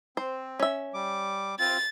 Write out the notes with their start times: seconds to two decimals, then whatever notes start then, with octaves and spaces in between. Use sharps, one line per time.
0.17 C4 C5
0.60 C#4 E5
0.94 G3 D6
1.60 C4 F4 A6